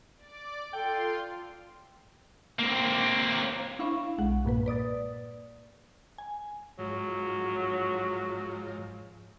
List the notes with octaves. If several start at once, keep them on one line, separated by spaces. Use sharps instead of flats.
D5 D6
F4 A4 G5 C6
A#3 C4
D4 E4 F5 B5 C#6 E7
B1 G#3 F#5
G2 A#2 A#3 B4
B4 D5 D#6 A6
G#5
G#2 F3 F#3